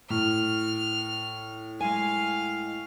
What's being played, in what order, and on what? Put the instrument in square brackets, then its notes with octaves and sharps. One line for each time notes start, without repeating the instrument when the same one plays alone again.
[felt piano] A2 [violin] F6
[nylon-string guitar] G#3 G#5 [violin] F5